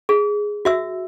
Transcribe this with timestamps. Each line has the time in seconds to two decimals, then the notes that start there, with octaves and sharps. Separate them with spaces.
0.09 G#4
0.65 F#4 E5 E6